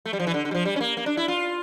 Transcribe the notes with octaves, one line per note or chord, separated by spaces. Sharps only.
A3
G3
F3
E3
D3
D3
G3
F3
G3
C#4
A#3
A#3
D4
E4
F4